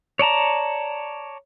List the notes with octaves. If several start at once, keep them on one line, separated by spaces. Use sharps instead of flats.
C#5 D5 A5 A#5